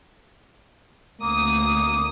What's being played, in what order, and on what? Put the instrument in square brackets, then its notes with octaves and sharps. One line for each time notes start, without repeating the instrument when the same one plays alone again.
[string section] D2 D#6 [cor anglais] A#3